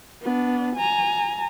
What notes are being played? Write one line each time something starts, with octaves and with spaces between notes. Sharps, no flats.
B3 D4
G#5 A#5